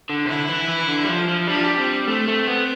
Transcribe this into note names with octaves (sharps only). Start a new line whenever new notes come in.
D3
C3
D3 E4
E3
E3
D3
G3
F3
F3
G3 D4
F3
G3
C4
A3 C4
A3
B3